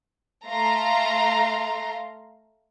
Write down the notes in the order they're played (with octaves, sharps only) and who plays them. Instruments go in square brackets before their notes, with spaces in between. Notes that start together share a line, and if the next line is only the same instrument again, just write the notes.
[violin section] A3 F5 A#5 C6